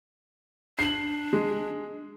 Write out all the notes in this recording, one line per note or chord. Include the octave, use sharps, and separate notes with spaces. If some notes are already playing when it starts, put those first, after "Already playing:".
D4 C7 F#7
G#3